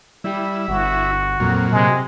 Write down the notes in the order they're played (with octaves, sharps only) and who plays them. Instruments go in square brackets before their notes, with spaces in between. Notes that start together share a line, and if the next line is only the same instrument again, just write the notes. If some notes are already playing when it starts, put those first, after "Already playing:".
[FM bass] G3 [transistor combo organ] E4
[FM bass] G1 [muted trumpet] F#4
[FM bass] F2 [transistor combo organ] A#2 F#3
[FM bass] C3 [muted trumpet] G#3